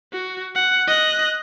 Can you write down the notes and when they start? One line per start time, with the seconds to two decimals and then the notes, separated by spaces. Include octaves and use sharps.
0.13 F#4
0.55 F#5
0.88 D#5 F#6